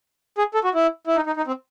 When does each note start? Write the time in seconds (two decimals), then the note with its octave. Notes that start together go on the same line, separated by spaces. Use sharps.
0.38 G#4
0.54 A4
0.64 F#4
0.75 E4
1.07 E4
1.16 D#4
1.26 D#4
1.37 D#4
1.47 C4